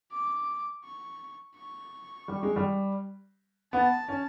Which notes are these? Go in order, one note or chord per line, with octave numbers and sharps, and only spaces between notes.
D6
C#6
C#6
G3
G#3
G3
B3 A5
C#4